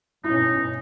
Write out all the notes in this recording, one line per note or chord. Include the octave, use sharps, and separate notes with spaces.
G2 B2 C#4 D#4 E4